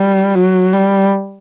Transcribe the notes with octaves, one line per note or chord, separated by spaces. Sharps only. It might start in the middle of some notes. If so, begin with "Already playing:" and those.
Already playing: G3
F#3
G3